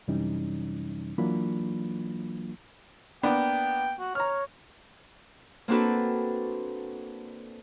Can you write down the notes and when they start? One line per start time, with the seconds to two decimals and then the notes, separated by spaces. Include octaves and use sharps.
0.08 F#2 C3 E3 G3 C#4 D#4
1.18 E3 F#3 A#3 D4 F4 B5
3.23 A#3 B3 D4 G5
3.99 F#4
4.15 C#5 A#5 F6
5.68 A#3 C4 D4 F#4 A4 B4